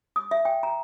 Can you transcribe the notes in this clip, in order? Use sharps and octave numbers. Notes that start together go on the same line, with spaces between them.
D#6
E5
G5
A#5